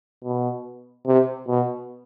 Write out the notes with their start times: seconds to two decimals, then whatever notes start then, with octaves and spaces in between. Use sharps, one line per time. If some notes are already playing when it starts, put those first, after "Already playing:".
0.23 B2
1.06 C3
1.48 B2